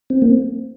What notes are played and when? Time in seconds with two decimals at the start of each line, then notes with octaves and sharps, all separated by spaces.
0.10 C4
0.22 A#3